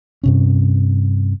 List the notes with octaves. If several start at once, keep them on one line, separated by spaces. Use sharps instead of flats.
G2 C3 C#4